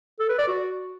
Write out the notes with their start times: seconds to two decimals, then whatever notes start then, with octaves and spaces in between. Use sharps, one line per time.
0.20 A4
0.29 B4
0.38 D5
0.48 F#4